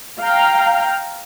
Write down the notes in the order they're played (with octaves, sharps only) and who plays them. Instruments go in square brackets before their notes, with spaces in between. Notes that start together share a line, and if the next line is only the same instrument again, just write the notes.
[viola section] F5 G5 A#5